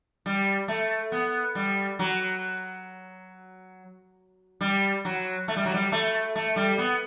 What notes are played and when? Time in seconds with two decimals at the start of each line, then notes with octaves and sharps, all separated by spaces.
0.26 G3
0.68 A3
1.12 B3
1.55 G3
1.99 F#3
4.61 G3
5.05 F#3
5.48 A3
5.56 G3
5.66 F#3
5.74 G3
5.92 A3
6.36 A3
6.56 G3
6.78 B3